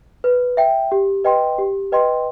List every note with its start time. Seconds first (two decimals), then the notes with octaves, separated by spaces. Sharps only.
0.24 B4
0.57 E5 G5
0.92 G4
1.24 B4 D#5 G5 C6
1.58 G4
1.92 B4 D#5 G5 C6